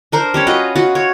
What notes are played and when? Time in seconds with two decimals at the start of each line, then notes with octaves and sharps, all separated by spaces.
0.12 D4 A#4 C5
0.34 G3 C#4 C#5
0.47 F4 F#4 B4 D#5
0.76 F4 F#4
0.95 C#5